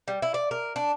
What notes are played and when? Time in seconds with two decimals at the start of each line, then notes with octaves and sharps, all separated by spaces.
0.08 G3
0.22 E4
0.34 D5
0.51 A#4
0.76 D4